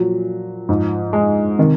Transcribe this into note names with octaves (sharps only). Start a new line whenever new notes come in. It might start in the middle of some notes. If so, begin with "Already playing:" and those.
Already playing: A#2 F3 F#3
G#2 F3
G#3
C3 D#3